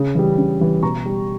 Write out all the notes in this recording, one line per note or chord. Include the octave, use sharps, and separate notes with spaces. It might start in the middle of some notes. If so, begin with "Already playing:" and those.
Already playing: C#3
E3 G3
C#3
E3 G3
B2 A#5 C#6
G3